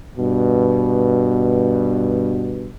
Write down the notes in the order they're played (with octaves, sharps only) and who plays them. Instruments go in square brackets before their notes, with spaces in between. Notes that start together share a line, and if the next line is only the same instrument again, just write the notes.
[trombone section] G2 B2